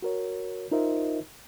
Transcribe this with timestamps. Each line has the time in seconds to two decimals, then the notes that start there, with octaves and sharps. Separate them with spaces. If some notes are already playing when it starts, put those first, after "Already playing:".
0.02 F#4 A#4 C#5
0.71 D#4 F4 A#4 C5 D#5 E5